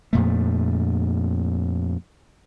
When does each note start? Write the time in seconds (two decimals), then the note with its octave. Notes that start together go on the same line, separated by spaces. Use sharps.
0.13 F2 A#2 A3